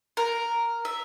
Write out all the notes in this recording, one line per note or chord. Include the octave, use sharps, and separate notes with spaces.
A#4
E5